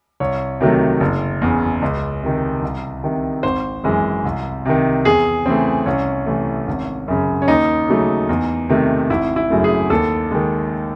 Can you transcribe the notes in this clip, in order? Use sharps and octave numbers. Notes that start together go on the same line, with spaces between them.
C2 C#5
C3 D#3 F#3 A3
F#1
E2 C#3
C#2
C3 D#3
C2
C3 D#3
G#1 C5
F#2 E3 G#3
C2
C3 D#3
E2 G#4
C#3 E3 A3 C4
C2 C#4
C3 E3 A3
G#1
F#2 C#3
C#4
D#2 D#4
C#3 F#3 A3
E2
C3 D#3 A3
G#1 E4
E4
F#2 C#3 F#3 A3
G#4
D#2 A4
D#3 G#3